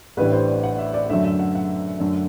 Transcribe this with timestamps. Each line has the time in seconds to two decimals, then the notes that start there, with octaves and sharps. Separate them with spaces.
0.17 A1 A2 E3 G3 D4 B4
0.32 C5
0.48 D5
0.63 F#5
0.78 E5
0.94 D5
1.09 F#2 D3 A3 E5
1.24 E5
1.39 F#5
1.55 F#5
2.00 F#2 D3 A3